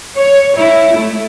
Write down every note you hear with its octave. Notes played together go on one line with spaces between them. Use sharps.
C#5
E4
A3